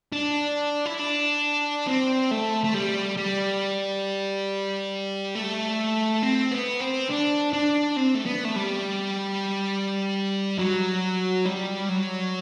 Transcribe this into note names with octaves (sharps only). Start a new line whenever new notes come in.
D4
E4
D4
C4
A3
A3
G3
G3
A3
C4
B3
C4
D4
D4
C4
A3
B3
A3
G3
F#3
G3
F#3